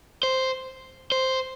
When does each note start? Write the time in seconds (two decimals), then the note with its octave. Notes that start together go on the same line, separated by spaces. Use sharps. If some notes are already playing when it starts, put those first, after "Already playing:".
0.23 C5
1.12 C5